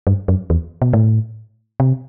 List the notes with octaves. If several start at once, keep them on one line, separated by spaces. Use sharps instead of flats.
G2
F#2
E2
B2
A2
C3